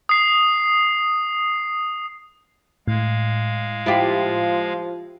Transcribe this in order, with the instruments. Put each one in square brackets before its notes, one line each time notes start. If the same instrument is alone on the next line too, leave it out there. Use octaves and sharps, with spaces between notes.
[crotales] D#6 C7
[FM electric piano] A2 [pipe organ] G#3 F5
[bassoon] F3 [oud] E4 F4 G4